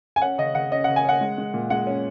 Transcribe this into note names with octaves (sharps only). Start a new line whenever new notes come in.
G#5
C#4 F#5
C#3 D#5
C#3 F#5
C#4 D#5
C#3 F#5
G#5
C#4 F#5
G#3
G#3
A#2
G#3 F#5
C#4